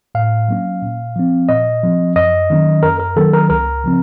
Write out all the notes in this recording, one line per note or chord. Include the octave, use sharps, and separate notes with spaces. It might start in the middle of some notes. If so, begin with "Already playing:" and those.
A2 F5
F#3 A#3 C#4
A#2
F3 C4
A#2 D#5
F3 C4
F#2 D#5
D#3 F#3 A#3 C#4
F#2 A#4
A#4
D#3 F#3 A#3 C#4 A4
A#4
C#2 A#4
C#3 F3 C4